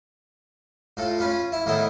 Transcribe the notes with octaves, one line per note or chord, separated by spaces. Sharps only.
A2 F4 A4
C#4 F4 B4
E4
A2 D#3 A3 B3 E4